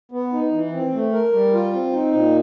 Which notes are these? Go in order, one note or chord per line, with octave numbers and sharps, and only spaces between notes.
B3
D#4
E3
C4
A3
A#4
G3
F4
C4
D#4
A#2